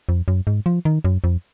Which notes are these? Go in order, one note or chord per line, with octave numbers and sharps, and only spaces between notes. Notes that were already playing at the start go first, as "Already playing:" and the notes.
F2
F#2
G#2
F3
D#3
F#2
F2